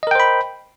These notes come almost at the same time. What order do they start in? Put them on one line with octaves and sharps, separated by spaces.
D#5 A#4 G5 C5 B5